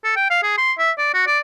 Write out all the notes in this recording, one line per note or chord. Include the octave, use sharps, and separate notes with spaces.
A4
G5
F5
G#4
C6
E5
D5
F#4
D5